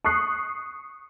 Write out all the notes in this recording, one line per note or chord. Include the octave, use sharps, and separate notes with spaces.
C#6 D#6 F#6 C7